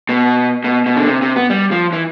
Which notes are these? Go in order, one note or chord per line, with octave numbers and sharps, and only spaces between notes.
B2
B2
B2
D3
C3
C3
B3
G3
F3
E3